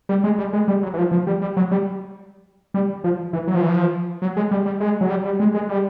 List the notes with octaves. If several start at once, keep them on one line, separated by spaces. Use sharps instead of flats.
G3
G#3
G3
G#3
G3
F#3
E3
F3
F3
G3
G3
F#3
G3
G3
F3
E3
F#3
F3
E3
F3
F#3
G#3
G3
G3
G#3
F#3
G3
G3
G#3
G#3
G3